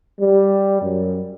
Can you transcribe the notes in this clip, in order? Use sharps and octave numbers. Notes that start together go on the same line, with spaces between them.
G3
F#2